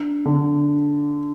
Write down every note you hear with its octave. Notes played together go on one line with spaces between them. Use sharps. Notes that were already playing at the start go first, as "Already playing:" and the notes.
Already playing: D4
D3